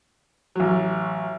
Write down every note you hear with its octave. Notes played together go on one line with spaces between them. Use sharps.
A1 F#3